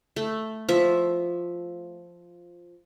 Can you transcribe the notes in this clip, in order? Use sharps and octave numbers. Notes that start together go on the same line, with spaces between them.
A3
F3 E5